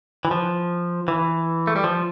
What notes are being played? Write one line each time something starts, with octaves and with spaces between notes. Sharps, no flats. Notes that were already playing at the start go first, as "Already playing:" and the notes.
E3
F3
E3
A3
G3
F3